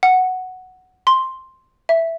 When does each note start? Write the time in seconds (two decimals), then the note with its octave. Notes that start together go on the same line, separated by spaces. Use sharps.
0.03 F#5
1.07 C6
1.89 E5